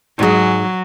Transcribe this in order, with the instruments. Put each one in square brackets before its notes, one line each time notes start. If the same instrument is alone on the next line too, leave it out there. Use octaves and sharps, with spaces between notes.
[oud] G#2 G#4 [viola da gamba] F#3